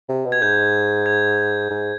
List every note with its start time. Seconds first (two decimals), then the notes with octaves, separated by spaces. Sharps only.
0.09 C3
0.25 B2
0.32 G#6
0.41 G#2 G6
1.06 G#6
1.71 G#2